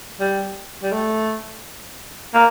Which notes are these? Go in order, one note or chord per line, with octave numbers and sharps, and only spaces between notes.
G3
G3
A3
A#3